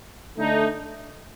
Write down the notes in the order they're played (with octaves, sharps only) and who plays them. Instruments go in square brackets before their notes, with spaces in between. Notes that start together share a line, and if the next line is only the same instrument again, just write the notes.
[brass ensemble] D3 A3 D#4